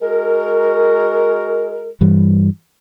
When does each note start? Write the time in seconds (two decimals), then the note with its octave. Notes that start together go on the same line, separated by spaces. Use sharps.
0.01 G#3 F#4 A#4
2.01 G2 E3 G3